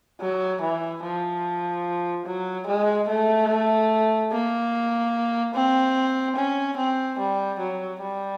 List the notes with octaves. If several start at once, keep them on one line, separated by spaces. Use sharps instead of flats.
F#3
E3
F3
F#3
G#3
A3
A#3
C4
C#4
C4
G3
F#3
G3